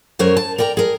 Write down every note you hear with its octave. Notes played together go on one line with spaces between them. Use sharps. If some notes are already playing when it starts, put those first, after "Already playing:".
F#2 F#3 A#4 C5 C#5
A5
A#4 D5 G5 A#5
G#4 A#4